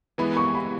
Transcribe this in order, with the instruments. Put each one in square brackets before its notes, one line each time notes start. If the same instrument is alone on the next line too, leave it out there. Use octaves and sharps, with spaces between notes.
[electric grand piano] E3 G#3 B3 E4 [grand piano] B5
[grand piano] C#6
B5